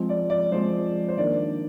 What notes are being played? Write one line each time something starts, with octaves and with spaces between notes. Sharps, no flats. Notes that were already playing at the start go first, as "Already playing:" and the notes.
Already playing: F3 G#3 C4
D5
D5
F3 G#3 C4 C5
C5
D#3 A#3 D4 D5